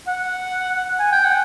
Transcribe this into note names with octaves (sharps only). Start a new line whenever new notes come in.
F#5
G#5
G5
F#5